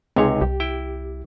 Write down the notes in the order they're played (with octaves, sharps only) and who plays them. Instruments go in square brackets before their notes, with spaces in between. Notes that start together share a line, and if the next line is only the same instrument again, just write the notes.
[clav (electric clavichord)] C#2 C3 C#5 [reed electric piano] G#3 D#4 G#4 [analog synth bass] C4
[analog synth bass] C2 [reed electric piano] G4
[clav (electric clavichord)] E4 G5